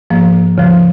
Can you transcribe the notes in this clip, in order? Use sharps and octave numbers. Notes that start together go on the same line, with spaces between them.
G#2 F3 A#3
D#2 C#3 F3